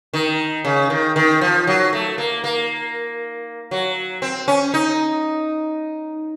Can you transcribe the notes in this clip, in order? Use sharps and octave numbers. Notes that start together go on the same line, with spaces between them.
D#3
C#3
D#3
D#3
F3
F#3
A3
A#3
A#3
F#3
C4
C#4
D#4